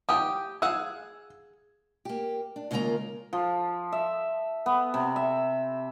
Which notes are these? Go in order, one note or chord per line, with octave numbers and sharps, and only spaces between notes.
G4 G5 D#6
G#4 F5 F#5 E6
A#3 G4
D4
D#2 C#3 G#3 A#3 F4 A#5
F3
E5
B3
C3
E5